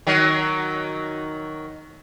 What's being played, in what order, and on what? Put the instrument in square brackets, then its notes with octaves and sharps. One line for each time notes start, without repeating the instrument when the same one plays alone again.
[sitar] D#3 F#3